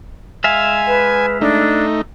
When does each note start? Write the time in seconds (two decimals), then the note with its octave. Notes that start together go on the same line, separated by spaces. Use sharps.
0.44 G#3 E5 F5 G#5
0.87 B4
1.41 A3 D4 D#4